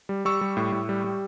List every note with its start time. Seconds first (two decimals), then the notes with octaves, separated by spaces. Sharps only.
0.09 G3
0.25 G3 C#6 E6
0.41 G3
0.57 A2
0.72 A2
0.89 G3
1.04 G3